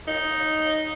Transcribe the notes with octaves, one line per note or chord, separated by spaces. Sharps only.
D#4